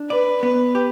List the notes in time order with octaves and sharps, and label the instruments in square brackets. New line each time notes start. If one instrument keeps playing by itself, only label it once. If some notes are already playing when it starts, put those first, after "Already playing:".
Already playing: [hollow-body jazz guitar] D4
[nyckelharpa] B4 [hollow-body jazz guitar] D5
[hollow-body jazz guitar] B3 [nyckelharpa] B4
[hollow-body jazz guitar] G4